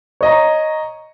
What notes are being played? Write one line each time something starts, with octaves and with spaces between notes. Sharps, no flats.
C#5 D#5 A#5